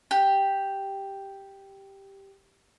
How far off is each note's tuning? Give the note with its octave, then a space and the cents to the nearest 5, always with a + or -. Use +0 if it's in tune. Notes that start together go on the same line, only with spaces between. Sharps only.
G4 +0